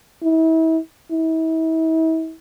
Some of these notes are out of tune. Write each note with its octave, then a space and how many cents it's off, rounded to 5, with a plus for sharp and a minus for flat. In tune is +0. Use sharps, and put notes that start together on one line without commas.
E4 -35
E4 -40